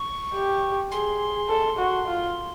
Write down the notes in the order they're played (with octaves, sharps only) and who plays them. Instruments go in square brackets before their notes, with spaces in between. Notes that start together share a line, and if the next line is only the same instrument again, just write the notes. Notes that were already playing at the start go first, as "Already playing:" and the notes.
Already playing: [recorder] C#6
[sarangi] G4
[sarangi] G#4 [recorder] C6
[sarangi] A4
F#4
F4